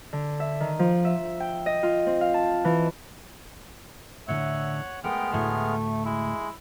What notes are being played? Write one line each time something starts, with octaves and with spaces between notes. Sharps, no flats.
D3
E5
D#3
F3
E5
G5
D#5
F4
C4
F5
A5
E3
A2 D3 C#5 E5 F#5
G#3 A3 B3 A#4 G5 F6
D2 A2 A3
G#3 E4